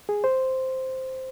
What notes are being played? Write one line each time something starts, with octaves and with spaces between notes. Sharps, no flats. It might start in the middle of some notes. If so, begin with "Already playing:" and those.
G#4
C5